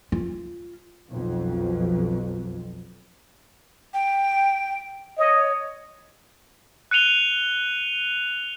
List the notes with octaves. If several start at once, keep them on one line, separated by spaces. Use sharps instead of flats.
F4
B1 F2
G5
C#5 D#5
F#6 C#7 D#7 F7 G7